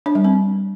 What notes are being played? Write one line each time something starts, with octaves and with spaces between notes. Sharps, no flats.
D4
G3
C4